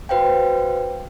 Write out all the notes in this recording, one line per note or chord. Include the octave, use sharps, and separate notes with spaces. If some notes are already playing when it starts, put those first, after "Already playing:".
F#4 B4 C5 F5 G5